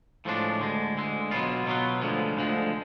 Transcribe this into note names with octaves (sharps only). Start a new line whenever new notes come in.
A2 F3 G#3 D4
D2 D3 G#3
D2 D3 G#3
B2 F#3 B3 F4
B2 F#3 B3 F4
D2 D3 F3 G#3
D2 D3 F3 G#3